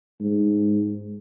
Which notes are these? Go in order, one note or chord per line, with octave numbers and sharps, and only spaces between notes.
G#2